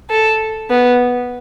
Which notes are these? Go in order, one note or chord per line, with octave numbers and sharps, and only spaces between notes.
A4
B3